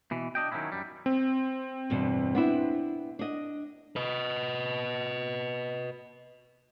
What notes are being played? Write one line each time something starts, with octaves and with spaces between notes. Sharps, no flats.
B2 E3
D4 D#5 G5
D#3 E3 F#3 C#4 E4
F#2 G3
C4
E2 G2 B2
B3 D4 E4
D4 D#5
B4 D#5